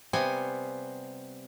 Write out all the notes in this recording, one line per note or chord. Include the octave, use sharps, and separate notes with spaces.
C3 G3 B3 C4 G#5